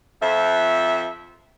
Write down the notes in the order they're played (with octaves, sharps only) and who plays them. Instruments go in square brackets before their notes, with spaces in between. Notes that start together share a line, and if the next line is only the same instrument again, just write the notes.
[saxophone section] F2 E5